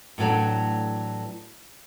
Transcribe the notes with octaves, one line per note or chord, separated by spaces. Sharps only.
A2 E3 F#3 A3 D4